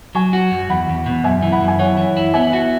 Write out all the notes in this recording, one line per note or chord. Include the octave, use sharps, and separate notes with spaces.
F#3 G#5 C#6
F#4
F#2
E2 F#5 B5
E2
B2
F#2 E5 G#5
E3
F#5 B5
F#2
G#5
E3 C#5 F#5
E3
E4
B3 E5 G#5
F#4